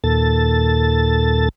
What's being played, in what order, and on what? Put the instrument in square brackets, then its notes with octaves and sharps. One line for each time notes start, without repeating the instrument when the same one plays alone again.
[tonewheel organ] D#2 A#2 A4 A6